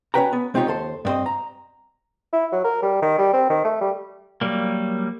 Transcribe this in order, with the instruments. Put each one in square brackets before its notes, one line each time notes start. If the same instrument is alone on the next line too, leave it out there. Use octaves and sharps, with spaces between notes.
[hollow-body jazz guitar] C#4 D4 F#4 B4 G5 A#5
B3
G#3 C4 D#4 F4 G4 C#5
D#2 A4 C5
G2 B3 C4 C5 D#5
A#5
[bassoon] E4
F#3
A#4
G3
D#3
G3
C4
D#3
A3
G3
[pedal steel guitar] F#3 G3 A#3